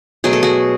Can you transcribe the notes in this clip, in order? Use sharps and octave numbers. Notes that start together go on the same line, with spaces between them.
B2 F#3 A3 G#4
A4
F#4 G#4